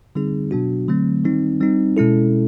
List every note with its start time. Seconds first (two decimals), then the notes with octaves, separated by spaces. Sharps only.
0.15 D3 G3 C4 D#4 G#4
0.51 B2 F#3 B3 D4 F#4
0.88 D3 F#3 A3 C4
1.24 D#3 G3 C4 D#4
1.60 G3 C4 D#4
1.97 B2 G#3 C#4 E4 A4